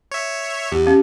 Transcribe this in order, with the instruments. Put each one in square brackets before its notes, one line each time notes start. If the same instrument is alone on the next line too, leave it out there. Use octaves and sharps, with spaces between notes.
[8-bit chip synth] C#5 E5
[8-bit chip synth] E2 [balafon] G4
[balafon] C#4 G4 F5